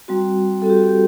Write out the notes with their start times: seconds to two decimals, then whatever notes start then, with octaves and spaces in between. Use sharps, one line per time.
0.08 G3 C4 F#4
0.62 G3 C4 F#4 A4
0.70 G4
0.77 F#4
0.84 G4